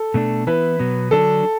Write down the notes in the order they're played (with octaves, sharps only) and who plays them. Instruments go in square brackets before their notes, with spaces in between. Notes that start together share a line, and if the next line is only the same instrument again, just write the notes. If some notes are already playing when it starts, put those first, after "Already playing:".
Already playing: [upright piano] A4
[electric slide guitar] B2 A3 D4
[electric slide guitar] E3 B3 E4 [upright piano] B4
[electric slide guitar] B2 F#3 B3
[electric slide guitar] D3 F#3 D4 [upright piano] A4